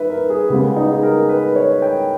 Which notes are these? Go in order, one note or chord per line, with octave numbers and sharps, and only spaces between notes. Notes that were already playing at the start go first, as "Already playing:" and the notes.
Already playing: D#3 B4 E5
A#4
G#4
C#3 G#3 B3 G4
D#4
G#4
A#4
B4
C#5
G5